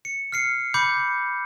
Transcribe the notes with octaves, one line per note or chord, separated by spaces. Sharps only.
C#7
F6 C7 C#7
B5 D6 G6 C#7